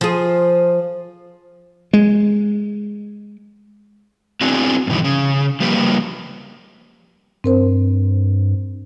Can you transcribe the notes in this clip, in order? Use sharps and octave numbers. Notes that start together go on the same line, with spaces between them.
F3 G#4
G#3
B3 C4 D4 E4 F#4 G#4
G2 B2 D#3 E3
C#3
F3 G3 A#3 G4 B4
G2 C4 A#4 C5